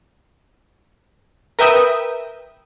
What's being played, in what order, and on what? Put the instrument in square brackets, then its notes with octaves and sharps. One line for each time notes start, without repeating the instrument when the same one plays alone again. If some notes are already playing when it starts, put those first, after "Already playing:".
[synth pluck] A#4 B4 E5 G5 D#6